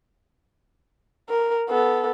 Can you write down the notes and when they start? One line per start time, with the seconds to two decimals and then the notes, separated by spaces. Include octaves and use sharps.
1.29 A#4
1.70 B3 A4